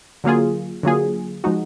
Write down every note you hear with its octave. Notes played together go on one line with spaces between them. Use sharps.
D3 F#3 A#3 F4 G#4
D3 F#3 A#3 F4 G#4
F3 G#3 D#4 F#4